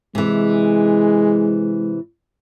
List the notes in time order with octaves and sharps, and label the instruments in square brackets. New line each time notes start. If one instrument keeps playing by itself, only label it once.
[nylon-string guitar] C3 E3 [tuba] G#3